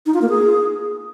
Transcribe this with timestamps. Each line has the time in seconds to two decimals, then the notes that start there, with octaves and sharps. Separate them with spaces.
0.06 D#4
0.14 F4
0.22 A#3
0.29 G#4